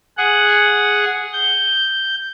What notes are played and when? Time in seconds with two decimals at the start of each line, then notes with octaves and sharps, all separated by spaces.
0.17 G#4 F#5
1.33 G6